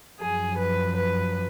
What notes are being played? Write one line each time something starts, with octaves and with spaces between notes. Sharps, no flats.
F#2 F3 G#4
B4
B4